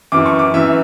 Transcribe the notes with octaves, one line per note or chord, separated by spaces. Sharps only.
F#2 E3 D6
C#6
D6
F#2 E3 E5